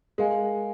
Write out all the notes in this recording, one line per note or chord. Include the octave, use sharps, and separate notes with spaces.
G#3 A#4 F5 G#5